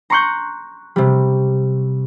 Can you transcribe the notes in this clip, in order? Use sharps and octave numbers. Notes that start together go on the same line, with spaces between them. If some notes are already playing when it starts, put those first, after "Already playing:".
A#5 C6 C#6 F#6 G6
C3 G3